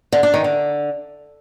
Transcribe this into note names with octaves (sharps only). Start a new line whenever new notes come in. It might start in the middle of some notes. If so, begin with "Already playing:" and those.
D3
D4
D#3
D3